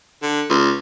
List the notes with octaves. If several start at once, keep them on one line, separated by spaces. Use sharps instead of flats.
D3
C#2